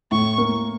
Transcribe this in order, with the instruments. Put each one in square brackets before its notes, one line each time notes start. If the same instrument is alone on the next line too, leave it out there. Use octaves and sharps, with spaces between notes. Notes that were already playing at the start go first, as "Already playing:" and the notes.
[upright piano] A2 [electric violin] C#6
[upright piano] A#3